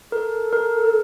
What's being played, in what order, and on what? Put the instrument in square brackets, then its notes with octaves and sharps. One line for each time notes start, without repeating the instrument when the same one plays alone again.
[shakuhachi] A4 [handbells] A#4
[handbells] A#4